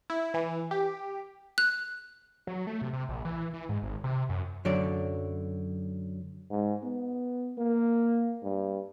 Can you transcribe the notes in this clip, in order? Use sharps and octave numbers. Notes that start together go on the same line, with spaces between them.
E4
E3
G4
F#6
F#3
A3
C3
C3
A#1
E3
E3
G#2
G#1
C3
F#2
F#2 D3 F#3 D5
G#2
B3
A#3
G2